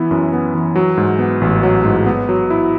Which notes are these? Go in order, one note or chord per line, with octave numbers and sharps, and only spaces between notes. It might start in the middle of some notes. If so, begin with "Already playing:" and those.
Already playing: E3 B3 E4
F#2
B3
E3
F#3
G#2
B3
A1
F#3
G#2
B3
F#3
E4